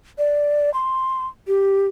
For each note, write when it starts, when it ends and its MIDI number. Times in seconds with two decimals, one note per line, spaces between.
0.18 0.72 74
0.74 1.26 84
1.47 1.87 67